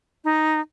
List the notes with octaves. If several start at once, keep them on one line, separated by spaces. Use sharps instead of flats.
D#4